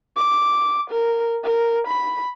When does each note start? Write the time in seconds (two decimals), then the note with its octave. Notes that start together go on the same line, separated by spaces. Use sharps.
0.16 D6
0.90 A#4
1.44 A#4
1.87 B5